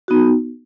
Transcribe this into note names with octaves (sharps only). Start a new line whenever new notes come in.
B3 D#4 F#4